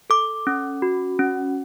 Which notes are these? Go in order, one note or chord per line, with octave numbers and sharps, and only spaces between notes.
A4 D6
C#4
F#4
C#4